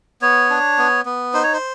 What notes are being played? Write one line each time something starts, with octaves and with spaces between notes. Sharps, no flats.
B3 C#5
D4
B3
B3
D#4 C5
C#5
C5